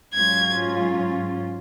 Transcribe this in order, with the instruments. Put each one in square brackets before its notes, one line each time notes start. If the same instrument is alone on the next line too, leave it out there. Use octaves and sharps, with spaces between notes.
[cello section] G#2 F#3 C#4 F4 [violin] G#6